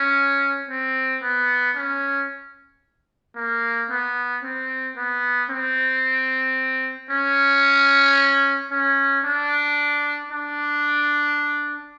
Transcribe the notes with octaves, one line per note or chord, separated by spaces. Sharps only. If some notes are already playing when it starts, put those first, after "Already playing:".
Already playing: C#4
C4
B3
C#4
A#3
B3
C4
B3
C4
C#4
C#4
D4
D4